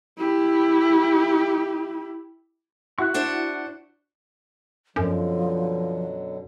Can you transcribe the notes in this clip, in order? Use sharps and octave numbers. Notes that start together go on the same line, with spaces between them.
E4 G4
E4 F#4 C#6 F#6
D4 C5 F#5
F#2 B2 D3 F3 F#3